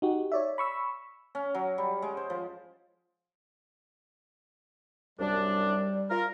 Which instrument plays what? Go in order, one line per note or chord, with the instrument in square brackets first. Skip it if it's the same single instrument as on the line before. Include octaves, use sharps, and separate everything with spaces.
[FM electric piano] D#4 F#4 G4
C#5 D5 E5
B5 C#6 E6
[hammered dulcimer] C#4
F#3
G3
G#3
C5
F3
[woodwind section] C2 F#2 D4 [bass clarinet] G3
[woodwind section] F4 A#4